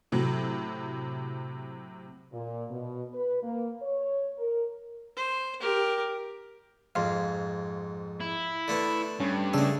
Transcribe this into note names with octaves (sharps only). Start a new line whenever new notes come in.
A2 C3 F#3
A#2
B2
B4
A#3
C#5
A#4
C5
G4 A#4
F2 G#2 F5 C6
E4
D3 A3 B3
G2 C#4
C#3 A3 D4 G#4 E6